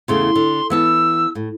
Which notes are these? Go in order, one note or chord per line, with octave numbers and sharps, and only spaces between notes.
E2 C#3 A3 C6
D3
E3 B3 A5 E6
A2